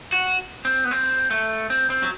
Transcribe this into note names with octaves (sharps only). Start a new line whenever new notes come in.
F#4
C4
B3
C4
A3
C4
C4
F#3